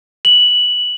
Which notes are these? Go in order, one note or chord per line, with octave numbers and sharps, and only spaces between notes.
F#7